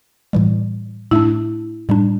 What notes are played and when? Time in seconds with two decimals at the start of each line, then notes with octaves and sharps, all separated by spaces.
0.33 A2 E3 G3
1.11 A2 A3 D4 E4
1.89 A2 G3 D4